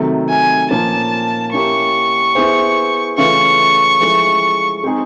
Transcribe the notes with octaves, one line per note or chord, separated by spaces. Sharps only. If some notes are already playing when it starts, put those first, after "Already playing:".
Already playing: C3 D#3 F#3 A3
G#5
A#2 F3 A#3 C#4 A5
A#3 C#4 E4 G4 A#4 C#6
B3 E4 G#4 C5
C#3 E3 A3 C#4 F4 C#6
F3 G#3 C#4 E4 A4
G#3 C4 D#4 G#4